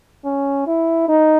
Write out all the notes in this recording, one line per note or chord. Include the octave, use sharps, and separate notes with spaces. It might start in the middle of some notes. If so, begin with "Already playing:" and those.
C#4
E4
D#4